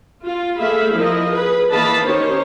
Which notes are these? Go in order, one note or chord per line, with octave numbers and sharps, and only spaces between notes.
F4
A3 G#4 E5 F5 B5
F3 E4 A#4 D#5
G#4 B4
E3 A#3 D#5 F5 A5 B5
D#3 C#4 D#4 G4 C5 C#5